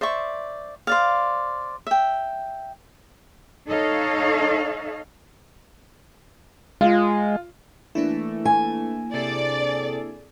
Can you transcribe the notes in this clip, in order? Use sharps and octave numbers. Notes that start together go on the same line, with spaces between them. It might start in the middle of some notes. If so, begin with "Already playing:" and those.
C5 D5 E5 C#6
C5 D5 F5
E5 G5
D#4 A4 C#5 D#5 F5
G#3 F4
E3 A3 A#3 D4 E4
G#5
C3 G#4 A4 D5